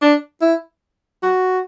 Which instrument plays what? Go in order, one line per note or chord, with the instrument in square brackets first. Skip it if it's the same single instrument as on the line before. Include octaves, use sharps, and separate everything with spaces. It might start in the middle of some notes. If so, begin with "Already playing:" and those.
[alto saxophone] D4
E4
F#4